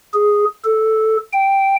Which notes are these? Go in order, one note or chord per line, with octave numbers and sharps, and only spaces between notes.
G#4
A4
G5